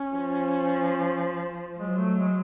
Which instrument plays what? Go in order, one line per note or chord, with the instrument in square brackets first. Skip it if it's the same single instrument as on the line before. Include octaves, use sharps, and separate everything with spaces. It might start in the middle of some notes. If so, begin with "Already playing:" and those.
Already playing: [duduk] C#4
[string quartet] F3
[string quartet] F#3 [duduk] G#3
[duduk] A3
G#3